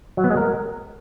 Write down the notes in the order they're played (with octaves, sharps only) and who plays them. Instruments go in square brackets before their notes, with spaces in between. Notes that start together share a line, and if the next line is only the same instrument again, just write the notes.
[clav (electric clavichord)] F#3
B3
G#3
A#4